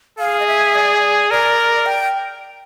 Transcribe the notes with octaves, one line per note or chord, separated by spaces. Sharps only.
G#4 F5
D#5
E5
D5
A#4 D5
G5